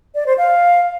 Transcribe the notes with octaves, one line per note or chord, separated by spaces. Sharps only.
D5
C5
F5